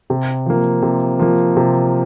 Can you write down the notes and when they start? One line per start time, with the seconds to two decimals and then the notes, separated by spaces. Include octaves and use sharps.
0.10 C3
0.46 F3 A#3
0.82 C3
1.19 F3 A#3
1.57 C3